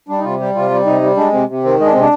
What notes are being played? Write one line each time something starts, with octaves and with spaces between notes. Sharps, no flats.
G3 D4
D#4
C3 F4
G3 G4
C3 F4
G3
C3 D#4
G3
G#3 D4
C3 C4
C3
D#3 C4
G#3 D#4
D4
C3 C4
D4